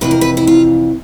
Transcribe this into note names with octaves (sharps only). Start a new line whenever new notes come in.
F2 C3 E3 B4
A#4
B4
E4
F4